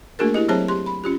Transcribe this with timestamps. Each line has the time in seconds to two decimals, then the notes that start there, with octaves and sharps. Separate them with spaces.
0.19 A3 A#3 D4 F#4 G#4 A#4
0.34 E4 G4 D#5
0.48 F#3 C4 G#4 C5 C#5 A5
0.68 G4 C6
0.86 B5
1.04 C#4 F4 G4